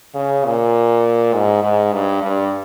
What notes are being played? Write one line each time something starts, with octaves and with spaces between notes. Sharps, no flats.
C#3
A#2
G#2
G#2
G2
G2